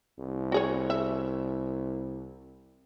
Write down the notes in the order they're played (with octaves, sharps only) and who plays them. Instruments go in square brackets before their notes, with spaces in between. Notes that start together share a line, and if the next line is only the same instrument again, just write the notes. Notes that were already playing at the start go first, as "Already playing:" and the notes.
[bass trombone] C2
[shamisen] F#4 G#4 C#5
E5